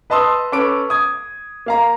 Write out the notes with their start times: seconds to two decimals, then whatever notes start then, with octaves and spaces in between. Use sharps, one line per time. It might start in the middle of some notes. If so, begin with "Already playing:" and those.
0.10 B4 D#5 A5 C6 D#6 E6
0.52 C#4 A4 B4 D6 D7
0.90 D#6 G#6
1.66 A#3 F5 A#5